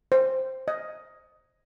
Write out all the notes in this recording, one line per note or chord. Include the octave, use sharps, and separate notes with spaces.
C5
D#5